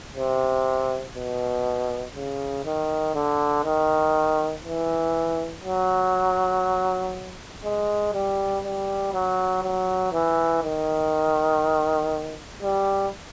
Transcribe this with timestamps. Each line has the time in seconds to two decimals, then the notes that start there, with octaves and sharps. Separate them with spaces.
0.16 C3
1.16 B2
2.16 C#3
2.66 D#3
3.15 D3
3.65 D#3
4.65 E3
5.64 F#3
7.64 G#3
8.14 G3
8.64 G3
9.14 F#3
9.63 F#3
10.13 E3
10.63 D#3
12.63 G3